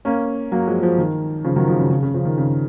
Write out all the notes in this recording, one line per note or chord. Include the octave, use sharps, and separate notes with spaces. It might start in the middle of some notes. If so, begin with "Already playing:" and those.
A#3 C#4
F#3 A#3
F3 G#3
F3 G#3
D#3
C#3 F3
D#3 F#3
F3 G#3
C#3
C#3
C#3
C#3 F3
D#3
C#3